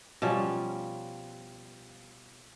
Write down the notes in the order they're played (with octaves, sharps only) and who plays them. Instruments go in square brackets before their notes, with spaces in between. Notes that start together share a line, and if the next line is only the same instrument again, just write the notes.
[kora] B2 F3 G3 C#4